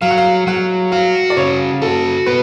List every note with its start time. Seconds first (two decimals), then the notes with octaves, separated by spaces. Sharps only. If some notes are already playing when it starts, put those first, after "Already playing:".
0.01 F#3 F5
0.11 F#5
0.18 F5
0.47 F#3 F#5
0.92 F#4 F5
1.30 D5
1.37 C#3 C#5
1.82 F#4 A4
2.26 B3 B4